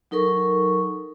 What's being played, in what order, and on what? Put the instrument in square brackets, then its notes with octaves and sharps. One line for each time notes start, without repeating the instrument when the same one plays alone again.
[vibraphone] F#3 D#4 A4 A#4 C#6